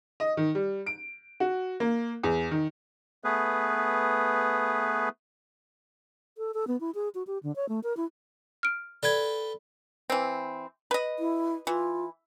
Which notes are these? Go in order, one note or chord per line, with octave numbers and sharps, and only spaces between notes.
D#5
D#3
G3
D7
F#4
A#3
E2
D#3
A3 B3 G#4 B4
A4
A4
B3
E4
G#4
F#4
G4
D3
C#5
A3
A#4
E4
F6 D7
A4 B4 D5 G5 G#6
E3 C4
B4 D#5
E4
E3 F4